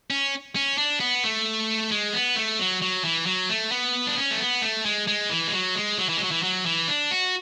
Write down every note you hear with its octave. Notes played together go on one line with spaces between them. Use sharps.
C#4
C#4
D4
B3
A3
G#3
B3
A3
F#3
F#3
E3
F#3
A3
B3
D4
C#4
A3
B3
A3
G#3
G#3
E3
G#3
F#3
G#3
F#3
E3
G#3
F#3
E3
F#3
E3
D4
F#4